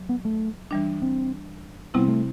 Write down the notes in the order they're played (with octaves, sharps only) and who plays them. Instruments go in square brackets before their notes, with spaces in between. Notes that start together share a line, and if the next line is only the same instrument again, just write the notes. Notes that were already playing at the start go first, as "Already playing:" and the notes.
Already playing: [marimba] F#3
[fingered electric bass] B3
A3
[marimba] E3 G3 D4
[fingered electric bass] C4
[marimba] C3 G3 C4 E4 [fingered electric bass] B3
[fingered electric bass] A3